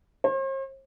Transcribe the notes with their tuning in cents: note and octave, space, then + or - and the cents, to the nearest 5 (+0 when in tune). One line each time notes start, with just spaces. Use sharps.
C5 +45